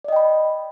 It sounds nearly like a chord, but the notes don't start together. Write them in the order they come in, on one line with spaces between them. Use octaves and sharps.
D5 D#5 G5 B5